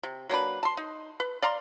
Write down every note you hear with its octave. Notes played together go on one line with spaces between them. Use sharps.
C3
F#3 A#3 D4 B4
A5 C6
D#4
B4
D5 F5 A#5 C6